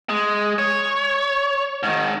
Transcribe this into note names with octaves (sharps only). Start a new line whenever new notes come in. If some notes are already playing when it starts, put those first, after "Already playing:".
G#3
C#5
G#2 D#3